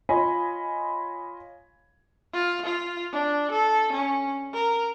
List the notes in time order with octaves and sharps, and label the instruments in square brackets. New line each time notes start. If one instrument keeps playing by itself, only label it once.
[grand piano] F4 C#5 D#5 G#5 B5
[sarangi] F4
F4
D4
A4
C#4
A#4